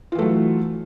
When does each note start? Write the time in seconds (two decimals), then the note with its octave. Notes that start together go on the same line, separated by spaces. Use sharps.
0.12 F4
0.15 E3
0.19 A3
0.22 F#3